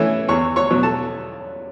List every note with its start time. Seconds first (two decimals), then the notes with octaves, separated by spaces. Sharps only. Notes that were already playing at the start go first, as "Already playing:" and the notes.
Already playing: E3 A3 C#4 E4
0.28 E2 C#5 C#6
0.56 C#5 C#6
0.70 B2 F#3
0.83 A4 A5